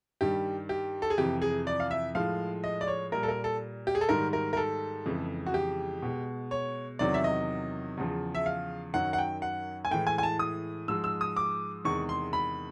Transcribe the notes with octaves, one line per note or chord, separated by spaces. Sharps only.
G2 D#3 G3 G4
G4
A4
G#4
F2 C3 E3 G4
G#4
D5
F5
E5
A2 F3 G#3 F5
D#5
D5
C#5
A#2 G3 A#4
A4
A#4
A4
G4
G#4
A4
G#2 D#3 G3 A#4
A#4
A#4
A4
F2 C#3 E3 G#3
F#4
G4
B2 G#3
C#5
E2 C3 D#3 F#3 D5
E5
D#5
E2 C#3 F3
E5
F5
F#2 D#3 F#3 F#5
F#5
G5
F#5
G#5
A2 E3 G#3 G5
G#5
G#5
A5
D#6
G#2 F3 G#3 E6
E6
D#6
D6
E2 C3 D#3 G#3 C#6
C6
B5